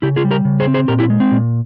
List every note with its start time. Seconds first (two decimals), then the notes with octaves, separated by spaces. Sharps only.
0.02 C#3 E4 G4
0.16 F4 G#4
0.25 G3
0.31 G4 A#4
0.45 C#3
0.60 G#4 C5
0.67 C4
0.74 G#4 C5
0.88 A#2 G4 A#4
0.99 E4 G4
1.10 G#3
1.20 C4
1.31 A#2